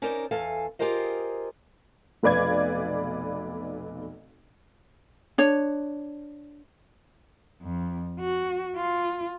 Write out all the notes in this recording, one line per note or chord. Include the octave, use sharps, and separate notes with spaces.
C#4 D#4 A#4 C5 D5
E2 A4 F5 G#5
F4 G4 G#4 A#4 C5 D#5
F1 B1 B4 D5 F5 G#6
D4 C#5
F2
F#4
F4